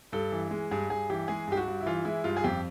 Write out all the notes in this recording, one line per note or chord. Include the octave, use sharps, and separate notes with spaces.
G2 A4
E3
G#3
G2 G#4
G2 G#4
E3 G4
G#3 G#4
G2 G4
F#4
G2
E4
E3 F4
G#3 E4
G2 F4
G#4
F2 G4